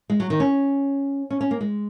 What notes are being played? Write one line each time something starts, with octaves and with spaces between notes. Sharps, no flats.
G#3
F#3
D#3
C#4
C#4
C#4
A#3
G#3